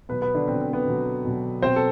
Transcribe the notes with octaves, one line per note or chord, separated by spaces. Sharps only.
B2 F#3 B3 B4
B3 B4
D3 D4
B2 F#3 C4
C4
B3 B4
B2 F#3
B2 F#3
B2 F#3 C4 C5
A4